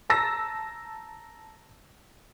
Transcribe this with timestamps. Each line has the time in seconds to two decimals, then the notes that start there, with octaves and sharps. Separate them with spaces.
0.10 A5 A#5 E6 A#6